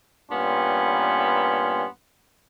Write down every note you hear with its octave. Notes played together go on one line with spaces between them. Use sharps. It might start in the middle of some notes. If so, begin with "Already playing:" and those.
G2 A#2 B3 C#4 C6